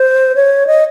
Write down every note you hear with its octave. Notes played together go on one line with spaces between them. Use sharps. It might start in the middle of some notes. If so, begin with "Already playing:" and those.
Already playing: C5
C#5
D#5